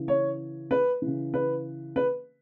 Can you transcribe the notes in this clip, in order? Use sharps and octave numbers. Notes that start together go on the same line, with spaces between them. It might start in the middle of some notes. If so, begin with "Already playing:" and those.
Already playing: C#3 E3
C#5
B4
C#3 E3
B4
B4